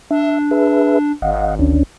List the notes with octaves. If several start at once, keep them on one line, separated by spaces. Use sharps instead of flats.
D4 E5
G#4 B4 E5
G#1 D#5 F5 F#5
D2 C#4 D4